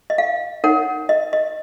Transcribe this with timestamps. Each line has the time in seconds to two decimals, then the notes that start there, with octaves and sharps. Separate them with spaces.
0.10 D#5
0.18 F5
0.64 D#4 A#4 C#5 F#5
1.09 D#5
1.33 D#5